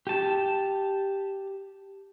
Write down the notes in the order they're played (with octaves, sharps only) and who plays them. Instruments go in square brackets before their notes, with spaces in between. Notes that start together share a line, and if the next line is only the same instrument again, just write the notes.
[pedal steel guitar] G4 A5